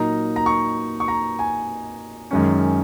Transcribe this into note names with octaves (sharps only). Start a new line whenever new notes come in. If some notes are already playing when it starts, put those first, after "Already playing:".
Already playing: A#2 F#3 A#3 D#4 A#5
A#5
C#6
C#6
A#5
G#5
F#2 D#3 G#3 C#4